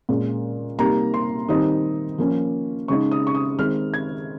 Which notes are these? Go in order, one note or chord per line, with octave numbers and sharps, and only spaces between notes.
A#2 G#3 C#4
C3 G3 A#3 D#4 A#5
C6
D#3 G3 C4 D#4 D#6
F3 A#3 C#4
C#3 G#3 D#4 C#6
D#6
C#6
D#6
D#3 G#3 C4 D#4 F6
G#6